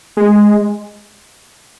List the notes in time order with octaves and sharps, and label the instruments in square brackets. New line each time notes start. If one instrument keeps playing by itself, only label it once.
[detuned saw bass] G#3